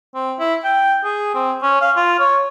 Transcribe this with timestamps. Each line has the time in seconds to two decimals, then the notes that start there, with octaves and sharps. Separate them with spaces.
0.15 C4
0.39 E4
0.64 G5
1.04 G#4
1.35 C4
1.62 C#4
1.81 F5
1.96 F4
2.19 C#5